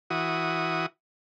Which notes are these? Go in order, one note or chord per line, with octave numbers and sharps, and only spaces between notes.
E3 F#4 D#6